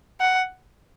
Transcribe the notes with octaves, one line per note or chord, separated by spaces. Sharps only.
F#5